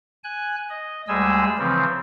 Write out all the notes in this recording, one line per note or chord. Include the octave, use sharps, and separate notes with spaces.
G#5 F#6
D#5
D2 G3 G#3 G#4 G#5 E6
C#3 E3 F3 C4